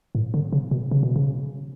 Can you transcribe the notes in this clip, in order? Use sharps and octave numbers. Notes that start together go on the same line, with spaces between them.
A2
D3
C#3
B2
C#3
B2
C#3